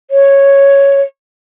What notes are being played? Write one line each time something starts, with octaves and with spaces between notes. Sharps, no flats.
C#5